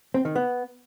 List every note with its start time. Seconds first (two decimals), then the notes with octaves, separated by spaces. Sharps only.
0.14 C4
0.25 D#3
0.35 B3